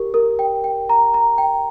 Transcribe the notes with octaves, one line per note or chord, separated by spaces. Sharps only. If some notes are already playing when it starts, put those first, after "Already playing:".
Already playing: G4 A#4
A#4
G5
G5
A#5
A#5
G5